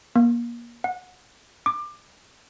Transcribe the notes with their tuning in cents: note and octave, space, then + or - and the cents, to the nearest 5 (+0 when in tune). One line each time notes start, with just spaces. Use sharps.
A#3 +30
F#5 -20
D6 +25